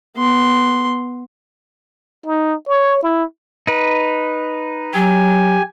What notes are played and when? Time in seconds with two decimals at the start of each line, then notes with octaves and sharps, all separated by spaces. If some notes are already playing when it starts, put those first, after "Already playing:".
0.17 B3 C6
2.26 D#4
2.68 C#5
3.03 E4
3.67 D#4 B4
4.94 F#3 G4 G#5